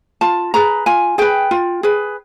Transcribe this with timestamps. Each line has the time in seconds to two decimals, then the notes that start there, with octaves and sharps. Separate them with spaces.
0.21 F4 A5
0.54 G#4 B4 A#5
0.86 F4 G#5
1.18 G#4 B4 G5
1.51 F4
1.83 G#4 B4